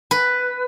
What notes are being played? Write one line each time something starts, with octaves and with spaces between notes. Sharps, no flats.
B4